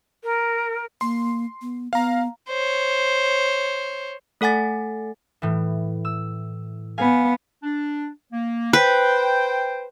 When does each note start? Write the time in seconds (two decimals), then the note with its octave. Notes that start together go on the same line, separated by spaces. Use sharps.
0.23 A#4
1.01 A#3 C6
1.61 B3
1.93 B3 F5 A#5
2.50 C5 C#5
4.41 A3 A4 F#5 G#5 A6
5.42 A2 E3
6.05 E6
6.98 B3 F5 G#5
7.63 D4
8.32 A#3
8.73 B4 C5 G5